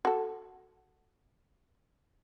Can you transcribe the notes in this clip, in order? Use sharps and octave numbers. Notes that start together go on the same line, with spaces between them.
F#4 A4